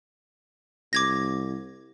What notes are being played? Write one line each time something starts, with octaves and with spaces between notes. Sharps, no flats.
C2 D6 G#6 A#6